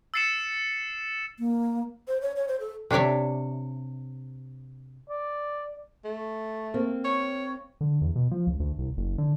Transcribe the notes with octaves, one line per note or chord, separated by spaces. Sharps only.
E6 A6 C7 C#7 E7
A#3
C5
C#5
C#5
C5
A4
C3 D4 C#5 D5 E5
D5
A3
A#3 C4
C#5
D3
E2
B2
F3
C#2
D2
C2
F#1
D3